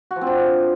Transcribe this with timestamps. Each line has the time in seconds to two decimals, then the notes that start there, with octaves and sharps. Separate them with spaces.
0.11 F#4
0.16 F3
0.21 C4
0.27 D4